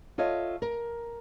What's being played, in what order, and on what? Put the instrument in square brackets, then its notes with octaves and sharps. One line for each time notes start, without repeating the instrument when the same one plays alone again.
[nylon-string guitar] F4 A4 C#5 D#5 E5
A#4